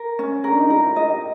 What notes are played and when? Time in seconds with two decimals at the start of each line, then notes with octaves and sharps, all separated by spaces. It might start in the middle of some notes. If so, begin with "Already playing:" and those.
Already playing: A#4
0.19 C#4
0.44 D4 A#4
0.59 D#4
0.70 E4 A#4
0.89 F4
0.96 D#5
1.09 G4